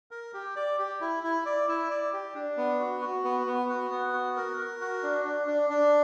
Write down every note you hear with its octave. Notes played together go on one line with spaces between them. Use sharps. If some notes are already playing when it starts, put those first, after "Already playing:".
A#4
G4
D5
G4
E4
E4
D5
E4
D5
G4
D4
B3
F#4
F#4
B3
B3
F#4
B3
F#4
A#4
A#4
F#4
D4
D4
D4
D4